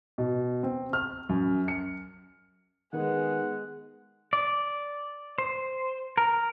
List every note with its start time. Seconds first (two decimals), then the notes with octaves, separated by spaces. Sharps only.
0.18 B2
0.63 C4
0.93 F6
1.29 F#2
1.68 C#7
2.93 D#3 G#3 B3 G#4 F#5
4.33 D5
5.38 C5
6.17 A#4